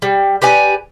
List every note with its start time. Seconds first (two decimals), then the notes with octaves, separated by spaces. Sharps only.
0.02 G3
0.42 G4 B4 D5 G#5